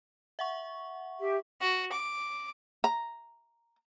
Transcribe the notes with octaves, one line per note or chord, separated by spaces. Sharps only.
E5 F#5 C#6
G4 E5
F#4
D6
A#5